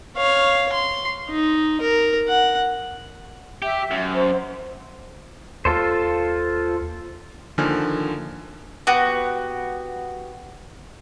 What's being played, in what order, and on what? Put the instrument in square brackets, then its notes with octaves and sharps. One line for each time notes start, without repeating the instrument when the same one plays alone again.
[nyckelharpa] C#5 F5
C6
D#4
A#4
F#5
[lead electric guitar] G4 [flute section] E5
[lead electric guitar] F#2
[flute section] C5
[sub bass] D#2 [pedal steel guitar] F4 A4 C5
[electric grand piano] D3 D#3 F3 A#3 G#5 F6
[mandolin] B3 F#4 G4